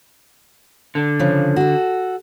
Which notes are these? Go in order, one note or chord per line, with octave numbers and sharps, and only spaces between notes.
D3
C#3 F3
F#4 A4